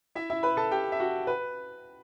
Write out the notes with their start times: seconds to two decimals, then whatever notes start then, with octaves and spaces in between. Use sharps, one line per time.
0.15 E4 E5
0.30 E4 E5
0.43 B4 B5
0.57 A4 A5
0.71 G4 G5
0.92 E5
1.00 F#4 F#5
1.27 B4